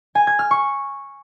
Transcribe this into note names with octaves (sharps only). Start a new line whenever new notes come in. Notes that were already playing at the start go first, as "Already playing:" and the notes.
G#5
G#6
F6
C#6